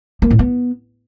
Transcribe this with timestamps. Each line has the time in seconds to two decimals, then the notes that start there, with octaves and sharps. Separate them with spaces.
0.22 A#3
0.31 A2
0.39 B3